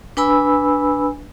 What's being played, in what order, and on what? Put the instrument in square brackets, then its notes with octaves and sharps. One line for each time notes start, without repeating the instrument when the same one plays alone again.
[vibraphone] D4 B4 G#5 B5 E6